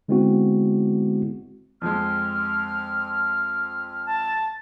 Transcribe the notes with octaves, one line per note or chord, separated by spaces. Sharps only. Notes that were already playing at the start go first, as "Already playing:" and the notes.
D3 G#3 B3 C4 E4 F#4
F2 F3 G#3 F6
A5